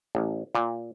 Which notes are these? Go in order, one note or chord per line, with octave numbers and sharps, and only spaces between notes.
A1
A#2